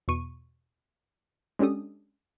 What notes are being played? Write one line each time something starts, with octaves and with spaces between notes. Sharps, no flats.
E2 B2 C#6 D#7
G#3 C#4 D4 G4 A4 D#6